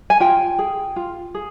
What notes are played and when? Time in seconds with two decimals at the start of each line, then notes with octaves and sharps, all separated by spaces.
0.10 G#5
0.20 F4 G5
0.59 G#4
0.96 F4
1.35 G#4